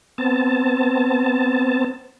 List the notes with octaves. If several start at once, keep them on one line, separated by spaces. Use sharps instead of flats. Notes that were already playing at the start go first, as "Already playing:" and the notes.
B3 C4 A5